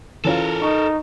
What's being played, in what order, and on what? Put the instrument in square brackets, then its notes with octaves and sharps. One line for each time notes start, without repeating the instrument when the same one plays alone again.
[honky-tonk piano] E3 C#4 F4 [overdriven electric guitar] A4 A#4
[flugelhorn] D#4 [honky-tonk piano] C#6